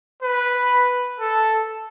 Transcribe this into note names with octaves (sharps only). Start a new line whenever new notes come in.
B4
A4